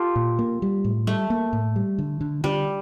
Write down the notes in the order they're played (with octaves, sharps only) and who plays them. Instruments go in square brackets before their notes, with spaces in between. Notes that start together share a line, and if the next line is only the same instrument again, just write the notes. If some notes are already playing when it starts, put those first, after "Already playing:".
Already playing: [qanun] F4 G4 A4
[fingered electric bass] A#2
A#3
G3
A2
[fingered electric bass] G3 [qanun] A3
[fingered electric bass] A#3
A2
G3
D3
D3
[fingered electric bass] D3 [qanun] G3